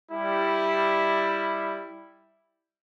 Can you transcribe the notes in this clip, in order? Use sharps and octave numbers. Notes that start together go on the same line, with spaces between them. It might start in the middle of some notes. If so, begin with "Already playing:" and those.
G3 E4